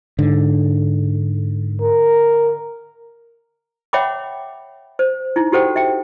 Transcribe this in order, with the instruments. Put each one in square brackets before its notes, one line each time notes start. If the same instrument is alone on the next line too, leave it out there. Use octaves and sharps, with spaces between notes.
[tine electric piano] G#2 [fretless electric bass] D3
[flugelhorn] A#4
[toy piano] C#5 E5 F#5 G5 B5 D6
C5
D#4 E4
F#4 G4 A4 C5 F#5 G5
E5 G5